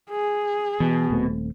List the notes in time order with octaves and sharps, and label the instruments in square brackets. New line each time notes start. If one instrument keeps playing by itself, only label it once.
[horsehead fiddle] G#4
[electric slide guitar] B2 [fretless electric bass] E3
[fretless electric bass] D#1 A3 C4